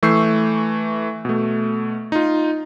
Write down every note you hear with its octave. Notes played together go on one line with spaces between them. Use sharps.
E3 A3 C#6 E6 G6 C7
B2 A3
D#4 F4